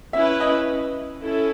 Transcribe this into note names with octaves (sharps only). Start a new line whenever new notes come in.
C#4 E4 B4 E5
D#5
C#4 E4 A4